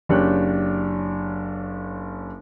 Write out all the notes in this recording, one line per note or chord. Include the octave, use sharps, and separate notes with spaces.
F#1 D4 G4 C#5 G5 F#6